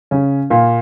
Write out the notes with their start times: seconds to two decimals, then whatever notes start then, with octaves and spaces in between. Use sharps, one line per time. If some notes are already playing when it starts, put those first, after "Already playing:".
0.11 C#3 C#4
0.50 A#2 A#3